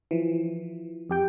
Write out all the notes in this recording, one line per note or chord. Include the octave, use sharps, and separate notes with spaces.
E3 F3
F2 G4 G5